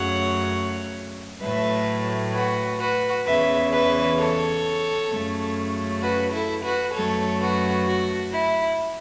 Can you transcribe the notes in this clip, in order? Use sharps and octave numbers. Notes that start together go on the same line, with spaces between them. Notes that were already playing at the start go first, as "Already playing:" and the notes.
Already playing: F#2 C#3 F#3 A3 C#5 F#5
A2 F#3 A3 B4 E5
F#4 B4
F#4 B4
E2 C#3 E3 B4 E5
B4 E5
A4 C#5
F#2 C#3 A3
F#4 B4
E4 A4
F#4 B4
F#2 F#3 A3 A4 C#5
F#4 B4
F#4
E4